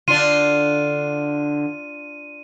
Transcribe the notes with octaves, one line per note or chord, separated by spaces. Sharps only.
D3 D4 F4 D#7